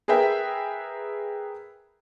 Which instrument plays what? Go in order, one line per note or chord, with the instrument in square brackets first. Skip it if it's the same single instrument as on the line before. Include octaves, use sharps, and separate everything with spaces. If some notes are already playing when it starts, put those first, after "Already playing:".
[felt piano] G#4 A#4 B4 E5 G5